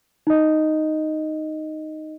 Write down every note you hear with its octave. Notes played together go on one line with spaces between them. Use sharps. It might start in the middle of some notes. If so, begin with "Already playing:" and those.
D#4 D#5